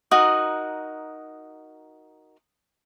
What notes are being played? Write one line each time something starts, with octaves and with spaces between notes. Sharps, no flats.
D#4 F#4 A#4 D#6 F#6